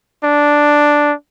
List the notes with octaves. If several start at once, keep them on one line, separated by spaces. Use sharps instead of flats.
D4